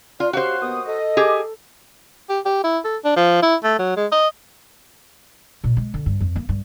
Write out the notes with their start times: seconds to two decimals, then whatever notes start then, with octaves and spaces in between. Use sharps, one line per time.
0.20 F4 D5
0.33 C4 F#4 G4 C5 C#5 F5
0.62 D#2 B3 D#6
0.86 A4 D#5
1.17 G4 G#4
2.29 G4
2.45 G4
2.64 E4
2.84 A4
3.04 D4
3.16 F3
3.42 E4
3.64 A3
3.79 F#3
3.97 G#3
4.12 D#5
5.64 A#2
5.77 G#3
5.94 D3
6.06 G2
6.20 F2
6.36 A#3
6.49 G2